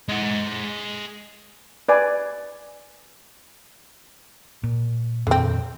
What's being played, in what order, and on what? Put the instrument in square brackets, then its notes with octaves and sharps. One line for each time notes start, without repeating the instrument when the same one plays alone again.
[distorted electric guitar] G#3 F#5
[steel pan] B4 D5 G#5
[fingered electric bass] A#2
[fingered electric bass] F2 A#2 D#3 [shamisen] D3 C4